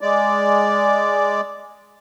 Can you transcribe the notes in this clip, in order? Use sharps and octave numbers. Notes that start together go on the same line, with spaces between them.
G#3 D5